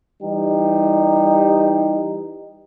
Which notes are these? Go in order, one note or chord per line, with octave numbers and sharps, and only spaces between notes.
E3 G3 D#4 G4